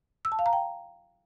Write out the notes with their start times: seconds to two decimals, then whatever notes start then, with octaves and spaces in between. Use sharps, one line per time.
0.25 E6
0.32 A5
0.39 F5
0.46 A#5
0.53 G5